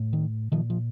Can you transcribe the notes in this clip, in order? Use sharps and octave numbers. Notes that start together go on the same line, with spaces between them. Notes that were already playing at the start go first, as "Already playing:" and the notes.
Already playing: A2
D#3
A#2 D#3 F3
F3